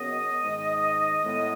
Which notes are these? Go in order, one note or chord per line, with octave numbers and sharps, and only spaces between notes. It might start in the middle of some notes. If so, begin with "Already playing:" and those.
Already playing: F#2 C#3 B3 D#5
G#2 D#3 G#3
A2 G#3 B3